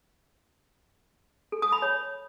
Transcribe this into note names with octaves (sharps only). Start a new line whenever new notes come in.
A4
D#6
B5
C#5